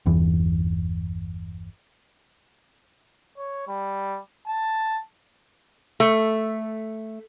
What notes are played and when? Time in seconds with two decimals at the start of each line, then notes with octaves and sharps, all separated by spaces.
0.06 G1 E2 E3
3.37 C#5
3.68 G3
4.47 A5
6.00 A3